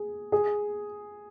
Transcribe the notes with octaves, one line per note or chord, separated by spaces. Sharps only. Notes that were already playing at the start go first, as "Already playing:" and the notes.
Already playing: G#4
G#4